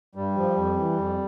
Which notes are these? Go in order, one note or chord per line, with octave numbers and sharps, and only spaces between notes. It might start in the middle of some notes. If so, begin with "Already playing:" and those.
G2 G3
F3
F2
E3
F2